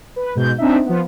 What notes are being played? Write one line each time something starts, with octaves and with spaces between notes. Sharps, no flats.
B4
G#2 B2 G6
C4 D4 D#4 E5
F3 B3